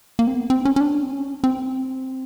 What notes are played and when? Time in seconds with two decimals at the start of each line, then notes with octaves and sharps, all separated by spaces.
0.19 A#3
0.27 C4
0.35 B3
0.50 C4
0.65 C#4
0.76 C#4
0.81 D4
1.03 C4
1.12 C#4
1.44 C4